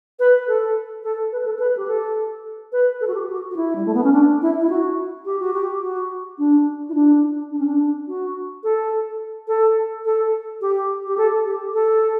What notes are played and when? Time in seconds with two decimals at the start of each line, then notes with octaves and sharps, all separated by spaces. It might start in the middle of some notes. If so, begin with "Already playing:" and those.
0.19 B4
0.48 A4
1.04 A4
1.32 B4
1.45 A4
1.59 B4
1.77 G4
1.87 A4
2.72 B4
3.01 A4
3.07 F#4
3.15 G4
3.29 F#4
3.51 F#4
3.56 E4
3.75 G3
3.86 A3
3.94 B3
4.04 C#4
4.13 D4
4.42 E4
4.61 E4
4.70 F#4
5.25 G4
5.40 F#4
5.53 G4
5.82 F#4
6.38 D4
6.89 E4
6.94 D4
7.51 D4
7.59 C#4
7.66 D4
8.08 F#4
8.64 A4
9.48 A4
10.05 A4
10.61 G4
11.07 G4
11.18 A4
11.45 G4
11.74 A4